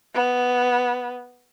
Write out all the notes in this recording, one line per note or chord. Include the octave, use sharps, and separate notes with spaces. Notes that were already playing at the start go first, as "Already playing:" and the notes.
B3